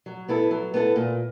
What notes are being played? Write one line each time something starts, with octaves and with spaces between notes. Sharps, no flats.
F#3
B3 E4 A4
F#3
B3 E4 A4
A#2